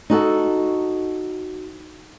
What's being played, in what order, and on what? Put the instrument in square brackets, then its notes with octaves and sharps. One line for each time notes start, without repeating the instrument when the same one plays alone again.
[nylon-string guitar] D#4 F#4 A4